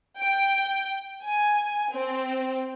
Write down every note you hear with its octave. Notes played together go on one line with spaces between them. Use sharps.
G5
G#5
C4